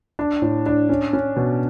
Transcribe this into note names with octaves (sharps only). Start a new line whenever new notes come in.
D4
A2
D4
C#4
C#4
B2